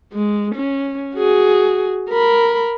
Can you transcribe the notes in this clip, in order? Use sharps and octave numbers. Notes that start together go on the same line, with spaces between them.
G#3
C#4
F#4 G#4
A#4 B5